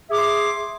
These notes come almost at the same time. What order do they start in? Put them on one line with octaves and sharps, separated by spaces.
E5 G#4 D6 C6